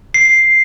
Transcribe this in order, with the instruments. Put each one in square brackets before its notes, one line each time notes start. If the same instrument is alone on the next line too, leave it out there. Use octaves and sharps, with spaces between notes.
[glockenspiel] C7